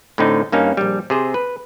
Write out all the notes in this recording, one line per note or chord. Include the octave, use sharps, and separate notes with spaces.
A2 D3 C4 D#4
G2 A#3 C#4 D#4
A#1 G3
C3 G#4 C5
B4